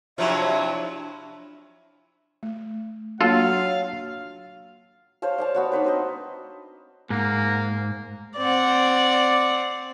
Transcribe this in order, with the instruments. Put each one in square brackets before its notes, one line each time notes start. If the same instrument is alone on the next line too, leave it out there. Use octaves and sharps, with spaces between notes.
[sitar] C3 F3 F#3 [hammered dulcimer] D4 E4 F4 [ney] E5
[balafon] A3
[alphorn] F#3 [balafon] A#3 D4 [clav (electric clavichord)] F4 A4 [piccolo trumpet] F5
[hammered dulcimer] C5 C#5 F5 A5
D5 F5 A5
B3 F#4 C#5
D4 D#4 B4 C5
C4 C5 D#5
[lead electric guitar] G#2 [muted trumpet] A#3
[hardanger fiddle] C4 F#5 [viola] D5